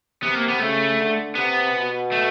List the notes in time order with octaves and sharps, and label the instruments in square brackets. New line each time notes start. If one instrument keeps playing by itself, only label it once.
[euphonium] C3 [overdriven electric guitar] B3
[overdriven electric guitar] A#3
B3
[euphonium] C#3 [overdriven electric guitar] A3
[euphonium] D3
[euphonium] C3 [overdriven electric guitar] B3
[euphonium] B2
[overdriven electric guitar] A3